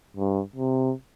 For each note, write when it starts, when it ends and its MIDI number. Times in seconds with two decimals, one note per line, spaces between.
0.17 0.41 43
0.56 0.92 48